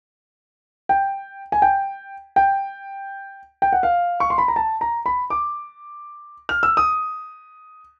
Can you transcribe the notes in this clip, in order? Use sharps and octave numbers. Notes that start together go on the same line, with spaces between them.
G5
G#5
G5
G5
G5
F#5
F5
C#6
C6
B5
A#5
A5
A#5
B5
D6
F6
E6
D#6